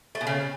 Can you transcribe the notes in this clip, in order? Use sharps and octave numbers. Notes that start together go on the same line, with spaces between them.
A3
B2
C#3